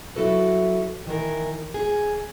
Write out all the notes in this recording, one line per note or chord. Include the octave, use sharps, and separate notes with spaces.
F#3 E4 F#4 A4 B4
D#3 E3 A#4
G#4